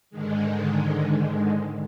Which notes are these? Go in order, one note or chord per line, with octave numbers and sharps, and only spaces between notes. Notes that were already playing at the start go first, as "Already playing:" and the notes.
G#2 D3 D#3 G#3